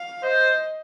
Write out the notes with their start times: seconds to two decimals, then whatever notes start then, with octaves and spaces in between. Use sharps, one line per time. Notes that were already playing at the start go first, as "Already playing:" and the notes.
Already playing: F5
0.23 C5 D#5